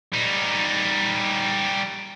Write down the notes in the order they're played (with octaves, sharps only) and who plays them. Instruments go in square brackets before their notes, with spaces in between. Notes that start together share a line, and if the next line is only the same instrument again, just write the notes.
[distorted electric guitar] G3 D#4